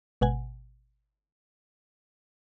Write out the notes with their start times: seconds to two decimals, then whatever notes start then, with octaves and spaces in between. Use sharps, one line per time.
0.21 G#1 B2 F#5 G#5